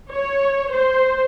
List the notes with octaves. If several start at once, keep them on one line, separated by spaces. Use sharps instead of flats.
C#5
C5